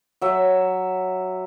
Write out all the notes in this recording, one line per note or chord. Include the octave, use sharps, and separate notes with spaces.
F#3 E5